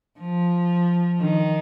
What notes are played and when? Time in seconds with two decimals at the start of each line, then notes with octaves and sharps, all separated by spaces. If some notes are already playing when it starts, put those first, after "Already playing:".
0.19 F3
1.20 D#3